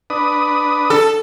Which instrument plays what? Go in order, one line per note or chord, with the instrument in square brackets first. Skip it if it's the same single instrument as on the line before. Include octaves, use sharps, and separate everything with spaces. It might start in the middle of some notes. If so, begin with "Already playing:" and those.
[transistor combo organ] D4 B4 D#6
[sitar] A4